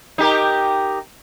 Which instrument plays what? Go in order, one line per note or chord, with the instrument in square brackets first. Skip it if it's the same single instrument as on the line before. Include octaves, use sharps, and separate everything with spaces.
[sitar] D#4 G4 A#4